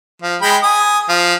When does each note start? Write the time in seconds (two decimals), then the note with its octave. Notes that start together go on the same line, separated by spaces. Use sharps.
0.22 F3
0.42 G#3 G5 B5
0.63 G#5 D#6
1.09 F3